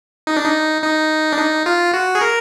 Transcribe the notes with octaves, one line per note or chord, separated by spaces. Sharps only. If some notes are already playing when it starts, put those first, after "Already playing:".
D#4
D4
D#4
D#4
D4
D#4
F4
F#4
G#4
A#4